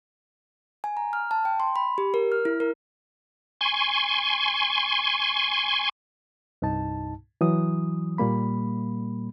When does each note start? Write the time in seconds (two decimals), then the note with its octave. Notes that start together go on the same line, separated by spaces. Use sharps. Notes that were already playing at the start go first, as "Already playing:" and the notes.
0.84 G#5
0.97 A#5
1.13 F6
1.31 A5
1.45 G5
1.60 C6
1.76 B5
1.98 G4
2.14 A#4
2.32 F6
2.45 E4
2.60 A#4
3.61 G#5 C6 C#6
6.62 C2 G2 D#4 A5
7.41 E3 F#3 D#6
8.18 A#2 G3 A#3 B5